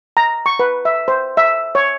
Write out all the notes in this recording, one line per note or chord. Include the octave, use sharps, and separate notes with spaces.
A#5
C#6
B4
E5
C5
E5
C#5